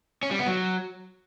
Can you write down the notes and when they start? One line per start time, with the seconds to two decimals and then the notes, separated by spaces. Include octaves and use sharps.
0.23 C#4
0.31 G3
0.39 B3
0.47 F#3